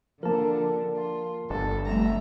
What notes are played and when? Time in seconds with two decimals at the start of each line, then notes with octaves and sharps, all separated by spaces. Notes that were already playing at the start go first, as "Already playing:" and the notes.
0.23 D3 F3 A#3 D4 A#4 A5
0.97 F4
1.50 G1 D4 A4
1.87 F2 G3 A3 E5 A#5